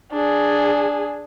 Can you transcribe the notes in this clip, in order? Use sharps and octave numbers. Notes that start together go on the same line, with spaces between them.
D4 G#4